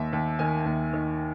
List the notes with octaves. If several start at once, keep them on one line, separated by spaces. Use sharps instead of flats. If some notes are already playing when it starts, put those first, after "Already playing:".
Already playing: D#2 E5
D#2
D#3 G#5
D#2
D#3